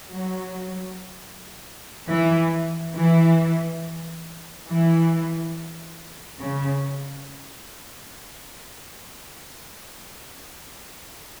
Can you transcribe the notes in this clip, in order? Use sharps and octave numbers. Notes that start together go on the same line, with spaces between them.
F#3
E3
E3
E3
C#3